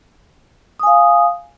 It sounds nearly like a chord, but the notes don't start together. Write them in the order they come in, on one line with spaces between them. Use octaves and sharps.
D#6 G#5 F5